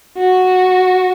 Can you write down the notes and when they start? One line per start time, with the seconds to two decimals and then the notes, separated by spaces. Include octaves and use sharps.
0.18 F#4